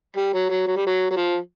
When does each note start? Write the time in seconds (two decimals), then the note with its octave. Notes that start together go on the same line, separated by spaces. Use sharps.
0.16 G3
0.34 F#3
0.50 F#3
0.67 F#3
0.77 G3
0.87 F#3
1.11 F#3
1.17 F3